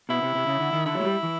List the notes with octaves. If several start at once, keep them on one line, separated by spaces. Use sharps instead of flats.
B2 E4
C3
C3
C#3
D3
D#3
D3 E4
F#3 G#3
G3
E3